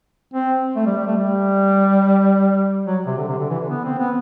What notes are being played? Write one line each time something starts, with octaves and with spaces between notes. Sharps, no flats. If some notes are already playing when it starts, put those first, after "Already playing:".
C4
A3
G3
G3
A3
G3
F#3
C3
D3
C3
D3
E3
D3
B3
C4
B3